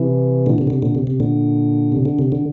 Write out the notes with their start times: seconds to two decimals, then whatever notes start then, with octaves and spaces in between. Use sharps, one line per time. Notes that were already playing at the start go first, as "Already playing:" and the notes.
Already playing: C3 E3
0.46 A#2 D3
0.58 C3
0.67 D3
0.70 C3
0.82 A#2 D3
0.95 C3
1.07 C3
1.20 A#2 D3
1.92 C3
2.05 D3
2.19 C3
2.32 D3